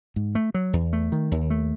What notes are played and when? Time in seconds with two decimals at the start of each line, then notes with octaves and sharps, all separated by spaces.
0.16 G#2
0.35 A3
0.54 F#3
0.73 E2
0.93 A3
1.12 D#3
1.32 D#2
1.50 A3